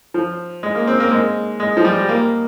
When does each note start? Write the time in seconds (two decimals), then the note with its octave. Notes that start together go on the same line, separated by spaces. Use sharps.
0.14 F3
0.63 G#3
0.75 A#3
0.87 C4
1.00 A#3
1.11 G#3
1.60 G#3
1.77 F3
1.84 G3
2.09 A#3